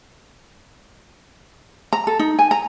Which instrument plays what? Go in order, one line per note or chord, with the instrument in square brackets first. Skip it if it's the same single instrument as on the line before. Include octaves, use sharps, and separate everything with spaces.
[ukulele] A#5
A4
D#4
G#5
A#5